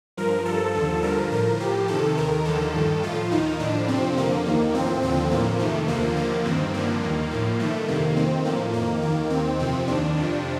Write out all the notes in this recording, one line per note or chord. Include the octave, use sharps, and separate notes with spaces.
G2 F3 A#4
G2 F3 A4
D#2 D3 F3
G2 D3 F3 A#4
A2 F3 A#4
A2 F3 G4
F2 C3 D#3 A4
D#2 D#3 A#4
D#2 D3 F3 A4
G2 D#3
A2 F3 F4
D#2 D#3 D#4
A2 F3 D4
F2 C3 F3 C4
F2 D3 F3 A#3
D#2 D#3
A2 F3 C4
D#2 D3 F3 C4
A2 F3 A#3
F2 C3 D#3 A3
D#2 D3 F3 A#3
D#2 D3 F3 A#3
G2 D#3 C4
G2 D3 F3 A#3
D#2 D#3
A2 F3 A#3
G2 D#3 A3
F2 C3 D#3 A#3
F2 D#3 C4
A2 F3 A#3
F2 D#3 A#3
D#2 D#3 A#3
D#2 D#3 C4
F2 C3 F3 C4
D#2 D#3 D4
F2 C3 F3